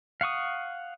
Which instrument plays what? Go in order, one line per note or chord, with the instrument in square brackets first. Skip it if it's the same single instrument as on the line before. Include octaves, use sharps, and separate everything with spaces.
[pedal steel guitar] F5 F#5 C#6 D#6